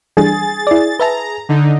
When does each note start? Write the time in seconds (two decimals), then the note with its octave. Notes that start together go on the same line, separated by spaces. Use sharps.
0.17 E3 G3 D4 G#4 A6
0.67 E4 D5
0.99 B4 E5 A5 A#5
1.49 D3 D#4